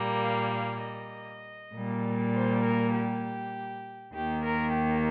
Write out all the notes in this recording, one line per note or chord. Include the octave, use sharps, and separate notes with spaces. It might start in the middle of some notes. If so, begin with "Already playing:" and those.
Already playing: A#2 G3 A#3
F5
F5
D#5
A#2 G3 A#3
C5
A#4
G4
D#2 D#3 A#3 G4
A#4
G4